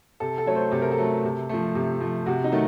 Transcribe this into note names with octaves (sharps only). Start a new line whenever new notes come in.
C3 A4
A4
F#3 A3 C#5
C5
C3 A4
A#4
A4
F#3 A3
C3
F3 A3
C3
F3 A3
C3 F#4
D#4
D#3 F#3 A3